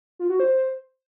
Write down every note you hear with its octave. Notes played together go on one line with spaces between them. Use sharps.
F4
F#4
C5